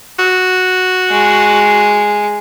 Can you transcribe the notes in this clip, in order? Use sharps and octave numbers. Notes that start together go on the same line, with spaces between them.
F#4
G#3